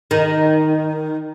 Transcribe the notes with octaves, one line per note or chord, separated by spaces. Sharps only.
D#3